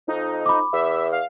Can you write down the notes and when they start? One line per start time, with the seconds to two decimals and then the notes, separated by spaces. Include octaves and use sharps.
0.08 F2 D#4
0.46 B5 D6
0.73 E2 E5
1.12 F5